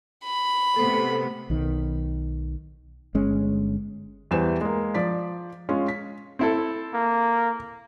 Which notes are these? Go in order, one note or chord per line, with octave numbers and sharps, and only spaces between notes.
B5
C3 A3 B3 A4 C5
B1 D#3
G1 G#3 C#4
E2 E3 G3 C5 E7
G#3 A#3
F3 D5 B6
G#3 C#4 F4
B6
C4 E4 A4
A#3